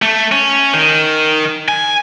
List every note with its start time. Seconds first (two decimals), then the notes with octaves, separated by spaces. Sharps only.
0.02 A3
0.32 C#4
0.74 D#3
1.69 G#5